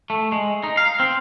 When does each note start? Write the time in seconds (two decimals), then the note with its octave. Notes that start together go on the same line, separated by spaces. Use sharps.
0.10 A3
0.32 G#3
0.64 D#4
0.77 F5
1.00 C4